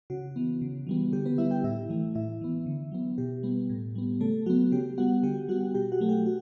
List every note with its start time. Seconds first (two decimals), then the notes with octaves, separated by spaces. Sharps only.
0.10 C#3 F#4
0.36 E3 B3
0.62 C#3
0.87 E3 G3 B3
1.13 D3 G4
1.25 B3 B4
1.38 G3 B3 E4 E5
1.51 G4 G5
1.64 A2 E4 E5
1.89 E3 A3
2.15 A2 E4 E5
2.41 E3 B3
2.66 D3
2.92 F#3 B3
3.18 B2 G4
3.43 G3 B3
3.70 A2
3.95 G3 B3
4.20 C#3 A3 A4
4.46 F#3 B3 F#4
4.72 C#3 G4
4.98 G3 B3 F#4 F#5
5.23 D3 G4 G5
5.49 G3 B3 F#4 F#5
5.74 B2 G4 G5
5.92 F#4 F#5
6.00 F#3 A3
6.09 G4 G5
6.26 F#4